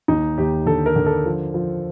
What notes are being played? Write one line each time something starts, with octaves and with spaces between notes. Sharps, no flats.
D#2 D#4
D#2 G4
D3 A4
A#4
D3
A4
F3
F3